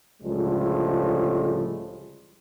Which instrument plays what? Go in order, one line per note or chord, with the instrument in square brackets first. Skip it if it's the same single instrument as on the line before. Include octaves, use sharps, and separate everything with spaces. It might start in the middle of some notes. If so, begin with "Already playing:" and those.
[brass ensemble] C#2 A2 D3 F3 G3 G#3